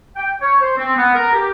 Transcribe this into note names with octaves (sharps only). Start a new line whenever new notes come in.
G5
C#5
C5
C4
B3
A#4
G4